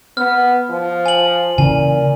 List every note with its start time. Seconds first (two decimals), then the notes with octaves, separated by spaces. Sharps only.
0.17 B3 F6
0.70 F3
1.06 G#5 F#7
1.58 A#2 C#3 E3 G#5